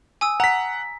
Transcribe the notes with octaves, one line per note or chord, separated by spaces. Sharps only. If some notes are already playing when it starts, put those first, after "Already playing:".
G#5 D#6 E6
F#5 A#5 B6